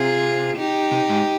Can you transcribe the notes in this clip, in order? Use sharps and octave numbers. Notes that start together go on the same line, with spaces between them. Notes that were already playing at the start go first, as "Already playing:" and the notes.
Already playing: C3 F4 G#4
D#4 G4
C3
G#2